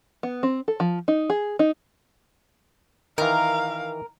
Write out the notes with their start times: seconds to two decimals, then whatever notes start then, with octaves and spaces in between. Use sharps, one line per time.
0.23 B3
0.43 C4
0.68 A4
0.80 F3
1.08 D#4
1.30 G#4
1.59 D#4
3.18 D#3 E3 A#4 F5